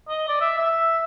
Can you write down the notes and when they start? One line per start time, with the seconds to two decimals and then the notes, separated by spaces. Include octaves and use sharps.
0.09 D#5
0.28 D5
0.41 E5
0.58 E5